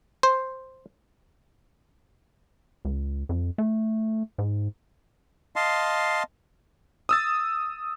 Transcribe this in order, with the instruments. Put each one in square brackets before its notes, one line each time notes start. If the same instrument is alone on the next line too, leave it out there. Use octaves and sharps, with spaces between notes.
[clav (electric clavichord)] C5
[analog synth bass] C#2
F2
A3
G#2
[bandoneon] D#5 F5 A5 C6
[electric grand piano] D#6 E6 A6